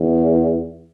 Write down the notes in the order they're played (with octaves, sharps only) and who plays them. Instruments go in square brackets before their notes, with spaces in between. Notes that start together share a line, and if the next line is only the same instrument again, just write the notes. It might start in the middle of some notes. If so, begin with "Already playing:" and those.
Already playing: [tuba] E2